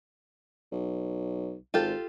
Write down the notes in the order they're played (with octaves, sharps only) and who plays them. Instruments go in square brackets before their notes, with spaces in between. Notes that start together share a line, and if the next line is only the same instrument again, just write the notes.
[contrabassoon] B1
[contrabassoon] G#1 [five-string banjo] F4 G4 A4